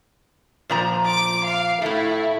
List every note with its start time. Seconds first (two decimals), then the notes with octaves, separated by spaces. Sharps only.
0.70 A#2 F3 A#5
1.08 D6
1.46 F5
1.82 A2 A3 E4